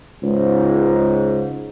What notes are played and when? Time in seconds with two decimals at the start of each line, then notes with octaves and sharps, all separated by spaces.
0.22 C#2 G#2